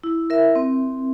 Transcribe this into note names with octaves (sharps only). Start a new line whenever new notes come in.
E4
A#4 E5
C4